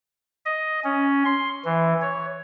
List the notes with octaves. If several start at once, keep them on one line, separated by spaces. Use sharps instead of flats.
D#5
C#4
C6
E3
C#5